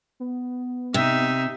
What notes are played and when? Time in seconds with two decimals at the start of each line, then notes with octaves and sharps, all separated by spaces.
0.20 B3
0.94 C3 D#4 E5